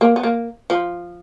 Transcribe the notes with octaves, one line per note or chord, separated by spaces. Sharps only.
A#3
B3
A#3
F3